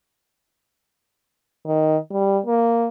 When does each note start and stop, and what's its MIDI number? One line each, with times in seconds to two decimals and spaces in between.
1.66 1.96 51
2.11 2.38 55
2.46 2.88 58